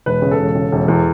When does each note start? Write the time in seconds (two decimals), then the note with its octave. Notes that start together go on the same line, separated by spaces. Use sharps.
0.06 E1 B4
0.22 C#3
0.31 A4
0.39 E1
0.55 C#3
0.72 E1
0.88 E2